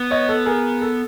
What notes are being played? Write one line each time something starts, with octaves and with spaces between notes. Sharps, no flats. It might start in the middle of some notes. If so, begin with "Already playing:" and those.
Already playing: B3
C#5 D#5
A4
G#4 A#4
A4